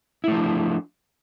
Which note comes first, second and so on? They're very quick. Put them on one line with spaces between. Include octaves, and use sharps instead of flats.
E4 A3 F3 D4